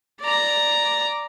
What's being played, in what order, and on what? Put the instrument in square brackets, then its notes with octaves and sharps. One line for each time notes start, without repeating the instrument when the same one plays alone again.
[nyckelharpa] D5 A#5